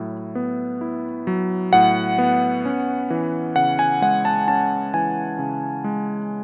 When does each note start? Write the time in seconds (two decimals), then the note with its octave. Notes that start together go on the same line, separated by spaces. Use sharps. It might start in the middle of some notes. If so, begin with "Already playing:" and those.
Already playing: A2 F#3 E4
0.35 B3
0.81 E4
1.27 F#3
1.73 A2 F#5
2.18 B3
2.65 C#4
3.10 E3
3.56 C#3 F#5
3.79 G#5
4.02 G#3 F#5
4.25 A5
4.48 C#4 A5
4.94 E3 G#5
5.39 C#3
5.84 G#3